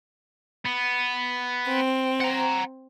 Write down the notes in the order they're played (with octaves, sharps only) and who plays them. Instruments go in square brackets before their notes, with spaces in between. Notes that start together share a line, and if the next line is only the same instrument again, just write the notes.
[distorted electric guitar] B3
[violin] C4
[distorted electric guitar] F#5 A#5